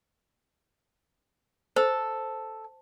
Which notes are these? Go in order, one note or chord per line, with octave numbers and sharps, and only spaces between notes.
A4 C5